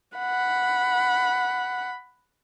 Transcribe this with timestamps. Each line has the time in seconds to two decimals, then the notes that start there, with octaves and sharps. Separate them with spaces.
0.18 F#5 B5